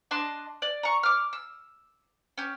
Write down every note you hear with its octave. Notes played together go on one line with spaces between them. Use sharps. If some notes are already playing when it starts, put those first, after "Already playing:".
D4 D#5 A5 C6
D5
A#5 C#6
D6 F6
E6
C#4 G4